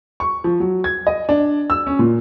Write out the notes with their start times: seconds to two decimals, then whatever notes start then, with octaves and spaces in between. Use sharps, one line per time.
0.20 C#6
0.44 F3
0.60 F#3
0.84 G#6
1.07 D#5
1.29 D4
1.70 E6
1.87 C#4
1.99 A#2